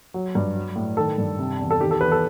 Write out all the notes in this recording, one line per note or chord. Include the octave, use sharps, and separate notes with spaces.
F#3
G2
F#3
A2
D#3 A4
G2
C3
E2
A4
D#3 G4
A4
E2 B4
A4